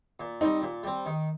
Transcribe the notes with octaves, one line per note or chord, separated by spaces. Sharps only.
A#2
G3 C4 D#4
A#2
G3 C4
D#3